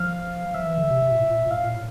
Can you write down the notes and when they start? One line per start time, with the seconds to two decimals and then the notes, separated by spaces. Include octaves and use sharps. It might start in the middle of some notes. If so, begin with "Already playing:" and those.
Already playing: F3 F5
0.54 F3 E5
0.67 E3
0.78 D3
0.91 C3
1.02 C3
1.11 A#2
1.20 A2
1.30 A#2
1.47 A#2
1.51 A2 F5
1.63 A#2
1.75 A2